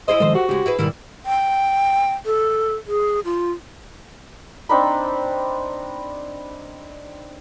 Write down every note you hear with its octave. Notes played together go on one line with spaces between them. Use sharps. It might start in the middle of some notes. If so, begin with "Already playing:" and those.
E4 G#4 C5 D#5
D#3 F3 G#3 A4 C5
F#4 G4 F#5
C#3 G#3 G4
E4 G#4 B4
G#2 B2 D#3 G3 E4 A#4
G5
A4
G#4
F4
C4 D4 D#4 B5